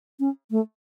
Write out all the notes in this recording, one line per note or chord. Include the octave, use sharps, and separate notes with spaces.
C#4
A3